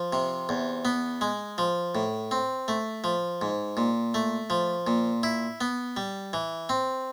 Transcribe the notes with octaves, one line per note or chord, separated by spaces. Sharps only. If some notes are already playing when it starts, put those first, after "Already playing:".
Already playing: F3
C3
E2
B3
G#3
F3
A2
C4
A3
F3
G#2
A#2
A3
F3
A#2
E4
B3
G3
E3
C4